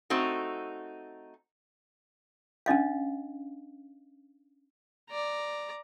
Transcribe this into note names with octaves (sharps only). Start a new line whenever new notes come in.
A3 C4 D#4 F#4
C#4 D4 D#5 F5
D5 A#5